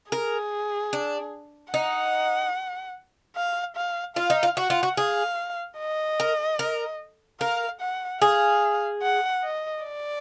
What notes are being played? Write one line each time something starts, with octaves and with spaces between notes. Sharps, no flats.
G#4 A#4
D4
D#4 F#5
F5
F5
F4 F5
D#4
F4
F#4 F#5
F4
F#4
G#4 F5
D#5
A#4
A#4
A#4 F5
F#5
G#4 F5
F#5
D#5
D5